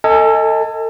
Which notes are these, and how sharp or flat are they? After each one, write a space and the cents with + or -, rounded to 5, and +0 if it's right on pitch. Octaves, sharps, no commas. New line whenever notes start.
A4 +30 D#5 +20 G#5 +0